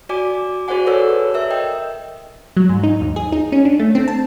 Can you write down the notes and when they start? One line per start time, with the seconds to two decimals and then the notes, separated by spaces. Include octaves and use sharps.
0.09 F#4 D5 G#5 D6
0.68 F#4 G#4 C5 D5 F#5 G#5
0.86 A4 B4 C#5 D5 F#5 E6
1.34 A#4 E5 E6
1.50 D#5 G5
2.57 F#3
2.69 G#2
2.83 D#4
3.01 D#2
3.16 G#4
3.32 D#4
3.52 C#4
3.65 D4
3.80 A3
3.95 C4
4.08 A5